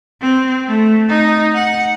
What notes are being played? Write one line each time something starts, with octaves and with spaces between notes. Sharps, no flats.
C4
A3
D#4
F#5